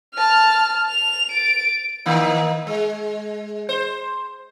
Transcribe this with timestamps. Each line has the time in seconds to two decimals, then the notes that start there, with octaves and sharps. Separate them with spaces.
0.14 A5 F6
0.89 F7
1.32 A6 D7
2.06 D#3 A#3 D#4
2.67 G#3
3.69 C5